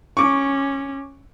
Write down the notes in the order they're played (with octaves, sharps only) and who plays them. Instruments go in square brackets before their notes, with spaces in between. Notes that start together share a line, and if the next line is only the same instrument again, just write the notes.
[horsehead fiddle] C#4 [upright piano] C#6 D6